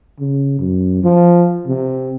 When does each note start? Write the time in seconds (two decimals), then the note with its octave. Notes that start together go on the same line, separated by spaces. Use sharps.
0.20 C#3
0.59 F#2
1.04 F3
1.67 C3